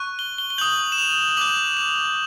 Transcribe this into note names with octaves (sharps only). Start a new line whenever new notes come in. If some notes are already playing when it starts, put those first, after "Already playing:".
Already playing: C#6 F#6
G7
G7
G7
D#6 G6 F#7
E7
F7
D6 G6 F#7
F7